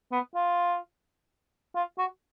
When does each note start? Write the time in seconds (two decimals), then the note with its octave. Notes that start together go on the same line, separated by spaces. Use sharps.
0.12 B3
0.35 F4
1.75 F4
1.98 F#4